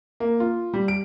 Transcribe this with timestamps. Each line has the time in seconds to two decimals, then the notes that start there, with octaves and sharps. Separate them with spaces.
0.20 A#3
0.40 F4
0.74 G3
0.88 D7